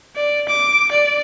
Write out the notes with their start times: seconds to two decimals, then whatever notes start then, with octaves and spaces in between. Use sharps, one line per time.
0.16 D5
0.48 D6
0.91 D5